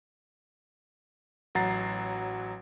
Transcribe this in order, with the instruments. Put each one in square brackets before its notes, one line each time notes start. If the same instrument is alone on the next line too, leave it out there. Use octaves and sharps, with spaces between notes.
[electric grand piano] A1 F#3 F#5 A#5 A6 C7